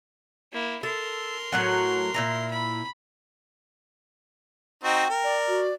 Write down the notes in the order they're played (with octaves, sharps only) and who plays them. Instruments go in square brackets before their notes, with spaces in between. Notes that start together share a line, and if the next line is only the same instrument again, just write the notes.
[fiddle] A#3 E4
[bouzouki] A4 [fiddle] A#4 C6
[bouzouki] A2 F#3 F#5
A#2 E4 A#5
[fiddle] B5
[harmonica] C4 D#4 F#4 [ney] G5
[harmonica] A#4
[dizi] D5
[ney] F#4